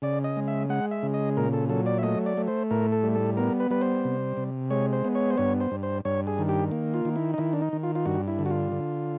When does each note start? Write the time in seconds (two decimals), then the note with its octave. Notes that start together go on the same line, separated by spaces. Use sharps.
0.02 C#3 D5
0.24 D#5
0.37 G#3
0.48 E5
0.69 G#3 F#5
0.91 E5
1.03 C#3
1.14 D#5
1.37 A#2 A#4
1.53 A4
1.69 F#3 A4
1.86 D5
1.98 E5
2.03 A3 D#5
2.26 D5
2.37 A3
2.47 C5
2.71 A2 A#4
2.92 A4
3.03 G3
3.15 A4
3.37 B3 A#4
3.60 B4
3.71 G3 B4
3.81 C5
4.05 C3
4.37 C3
4.70 G#3 C#5
4.93 C5
5.05 B3
5.15 C#5
5.30 C5
5.38 G2 C#5
5.60 C5
5.71 G2
5.83 C5
6.05 G2 C#5
6.27 G#4
6.39 D#3
6.49 G4
6.71 A#3
6.94 F4
7.05 D#3
7.16 E4
7.34 D#4
7.38 D#3 E4
7.53 D4
7.61 D#4
7.73 D#3
7.83 F4
7.95 F4
8.06 G2 F#4
8.28 E4
8.39 D3
8.46 F#4
8.50 F4
8.72 D3